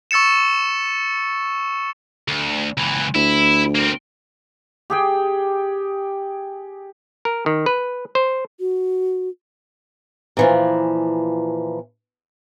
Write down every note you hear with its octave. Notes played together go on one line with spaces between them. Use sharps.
C#6 E6 A6 C#7 E7
D2
C#2 E3
D2 E4
A#3 C4
G4 G#4 G5
A#4
D#3
B4
C5
F#4
A#2 E3 F3